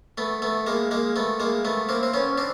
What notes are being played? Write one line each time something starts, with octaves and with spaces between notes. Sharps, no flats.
A3 B3
A3 B3
G#3 A#3
G#3 A#3
A3 B3
G#3 A#3
A3 B3
A#3 C4
C4
B3 C#4
C4 D4